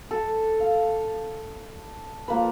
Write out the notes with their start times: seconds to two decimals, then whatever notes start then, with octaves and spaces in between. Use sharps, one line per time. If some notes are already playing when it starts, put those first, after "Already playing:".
0.11 A4
0.60 F5
2.28 F3 A#3 B4